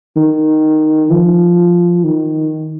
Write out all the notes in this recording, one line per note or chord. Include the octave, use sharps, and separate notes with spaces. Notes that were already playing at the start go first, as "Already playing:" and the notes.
D#3
F3
D#3